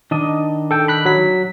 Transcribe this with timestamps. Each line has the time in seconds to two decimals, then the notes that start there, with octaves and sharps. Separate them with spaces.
0.11 D#3 D4 D#5
0.71 A4 G5
0.88 B5 F#6 B6
1.05 F#3 B6